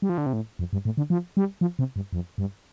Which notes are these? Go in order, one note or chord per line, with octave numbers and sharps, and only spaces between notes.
G3
F3
D3
C3
A2
F2
G2
A2
D3
F3
G3
F3
C3
G2
F2
G2